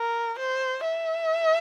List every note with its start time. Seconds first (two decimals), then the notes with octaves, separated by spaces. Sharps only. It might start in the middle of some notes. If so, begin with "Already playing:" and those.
Already playing: A#4
0.39 C5
0.84 E5